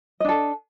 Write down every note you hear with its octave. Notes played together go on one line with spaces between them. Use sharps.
D4 A4 D#5